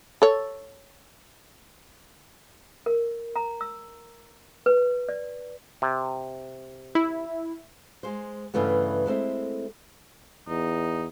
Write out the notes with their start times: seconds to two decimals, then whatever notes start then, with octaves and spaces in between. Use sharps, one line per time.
0.22 A4 C#5
2.86 A#4
3.36 A#5
3.61 E6
4.66 B4
5.09 D5
5.82 C3
6.95 E4
8.03 G#3 C5
8.54 G2 C#3 E3 A3 B3
9.06 G#3 A3 C4 E4
10.48 E2 D#4